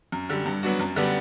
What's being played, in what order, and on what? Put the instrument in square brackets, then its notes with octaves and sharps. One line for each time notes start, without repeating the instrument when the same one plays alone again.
[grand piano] F#2
D3 G3
G2
F#3 B3 D4 F#4
F#2
D3 G3 B3 D4